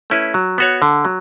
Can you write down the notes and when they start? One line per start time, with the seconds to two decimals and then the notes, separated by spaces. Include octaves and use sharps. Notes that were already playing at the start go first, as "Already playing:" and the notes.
0.10 A3 C#4 E4 B4
0.34 F#3
0.58 B3 F#4 C#5
0.82 D3
1.05 F#3